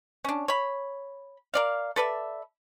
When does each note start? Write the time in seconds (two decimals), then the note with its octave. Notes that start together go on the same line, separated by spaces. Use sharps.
0.24 C#4 D4
0.48 C#5 B5
1.54 A#4 D5 F5
1.96 A4 B4 D5 E5